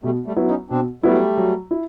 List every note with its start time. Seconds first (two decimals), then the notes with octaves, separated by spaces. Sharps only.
0.03 B2 G3 A3
0.26 G3 A3
0.36 F#3 B3 E4
0.48 C#4 D#4
0.70 B2 C4 D4
1.03 F#3 G3 A3 B3 E4
1.37 F#3
1.71 E4